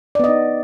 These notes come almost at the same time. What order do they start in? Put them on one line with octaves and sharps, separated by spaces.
D5 B3 D#5 D#4